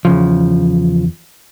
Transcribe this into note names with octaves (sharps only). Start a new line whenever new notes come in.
E2 C#3 F3